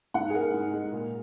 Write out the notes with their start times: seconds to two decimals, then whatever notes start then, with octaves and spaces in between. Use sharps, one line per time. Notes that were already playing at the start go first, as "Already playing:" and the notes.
0.14 G#2 F#5
0.30 G#4
0.34 G#3 A#4
0.54 G#2
0.73 G#3
0.93 A#2